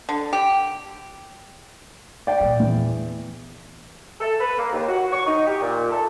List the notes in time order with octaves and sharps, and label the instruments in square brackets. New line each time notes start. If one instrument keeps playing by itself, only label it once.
[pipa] D3
G4
[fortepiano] D5 G5
[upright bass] A#2 E3
[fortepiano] E2
[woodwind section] A4
B4
A#3
D#2
F#4
C#6
D#4
G4
A#2
A4